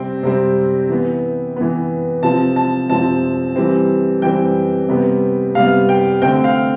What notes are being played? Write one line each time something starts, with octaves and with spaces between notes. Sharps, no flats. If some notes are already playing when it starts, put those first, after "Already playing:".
Already playing: C3 G3 C4 G5
C3 G3 C4
E3 B3
E3 B3
C3 F3 C4 A5
A5
C3 F3 C4 A5
E3 G3 C4
E3 G3 C4 G5
C3 G3 B3
C3 G3 B3 F5
G5
D3 A3 C4 G5
F5